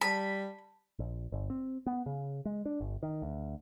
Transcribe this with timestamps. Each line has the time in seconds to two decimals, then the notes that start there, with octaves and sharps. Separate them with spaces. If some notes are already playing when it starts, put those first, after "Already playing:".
0.01 G3 A5 B5
0.99 A#1
1.32 G1
1.50 C4
1.86 B3
2.06 C#3
2.45 G#3
2.66 D4
2.81 G1
3.03 D#3
3.22 D2